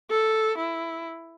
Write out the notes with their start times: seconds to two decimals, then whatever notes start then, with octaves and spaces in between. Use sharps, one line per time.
0.10 A4
0.58 E4